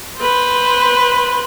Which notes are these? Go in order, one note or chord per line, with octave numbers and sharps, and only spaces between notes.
B4 C5